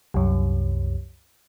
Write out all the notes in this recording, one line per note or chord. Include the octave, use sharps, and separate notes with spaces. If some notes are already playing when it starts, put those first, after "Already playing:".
C2 F#2